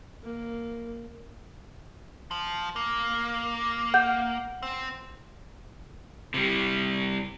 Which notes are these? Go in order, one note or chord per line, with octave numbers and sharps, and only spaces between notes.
A#3
F3
A#3
F#5 G6
C4
C3 G3